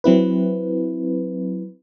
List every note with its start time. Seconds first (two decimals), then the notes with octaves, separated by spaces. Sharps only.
0.04 F#3 C4 E4 B4